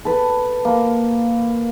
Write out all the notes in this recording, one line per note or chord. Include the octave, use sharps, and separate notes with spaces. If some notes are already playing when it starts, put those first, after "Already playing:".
A4 B4
A#3